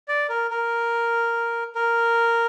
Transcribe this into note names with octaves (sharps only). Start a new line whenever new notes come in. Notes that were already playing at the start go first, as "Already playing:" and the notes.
D5
A#4
A#4
A#4